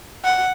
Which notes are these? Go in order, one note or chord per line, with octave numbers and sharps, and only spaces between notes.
F#5